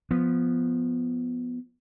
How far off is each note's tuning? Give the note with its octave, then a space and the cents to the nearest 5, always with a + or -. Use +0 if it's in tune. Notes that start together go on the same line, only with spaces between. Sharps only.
F3 +0 B3 +0